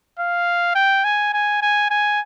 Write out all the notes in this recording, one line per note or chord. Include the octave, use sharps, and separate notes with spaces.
F5
G5
G#5
G#5
G#5
G#5